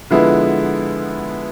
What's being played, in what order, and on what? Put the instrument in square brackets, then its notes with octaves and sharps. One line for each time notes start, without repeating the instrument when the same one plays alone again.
[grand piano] D3 F3 G#3 B3 E4